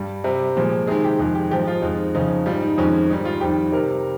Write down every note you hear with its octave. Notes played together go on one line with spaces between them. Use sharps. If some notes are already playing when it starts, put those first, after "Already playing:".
Already playing: G2 G3
C3 G3
A#2 F3 G#3
C3 D#3 G#3 G#4
G4
F2 D#3 G#3 G4
G4
G#2 F3 G#3 G4
D#4
F4
F2 D#3 G#3 D#4
F2 C#3 F3 D#4
G#2 G3 F4
D#4
F2 D#3 G#3 C#4
G#2 D#3 G3 D#4
F4
F2 D#3 G3 G4
C3 G3 A#4